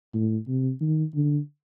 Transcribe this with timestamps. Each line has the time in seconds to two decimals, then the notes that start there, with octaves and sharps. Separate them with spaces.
0.14 A2
0.48 C3
0.81 D#3
1.15 D3